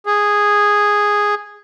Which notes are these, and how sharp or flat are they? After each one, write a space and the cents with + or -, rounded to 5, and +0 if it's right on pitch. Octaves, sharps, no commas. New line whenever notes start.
G#4 -5